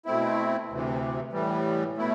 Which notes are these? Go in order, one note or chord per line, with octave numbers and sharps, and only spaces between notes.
B2 A3 C4 E4
D2 C3 E3
A2 E3 G3
B2 A3 E4